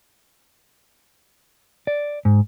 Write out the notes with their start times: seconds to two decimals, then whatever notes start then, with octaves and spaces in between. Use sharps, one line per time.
1.87 D5
2.25 G#2